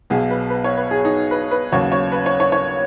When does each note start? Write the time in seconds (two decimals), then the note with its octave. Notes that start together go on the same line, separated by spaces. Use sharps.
0.10 B1 B2 F#3 G#4
0.31 B4
0.50 B4
0.64 C#5
0.77 B4
0.91 G#4
1.05 D#4
1.31 B4
1.51 B4
1.72 D#2 C#3 F#3 C#5
1.92 C#5
2.12 B4
2.26 C#5
2.40 C#5
2.52 C#5